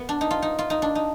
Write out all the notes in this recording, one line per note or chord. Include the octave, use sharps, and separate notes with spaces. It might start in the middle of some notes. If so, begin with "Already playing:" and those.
Already playing: B3
D4
D#4
F4
D#4
F4
D#4
D4
D#4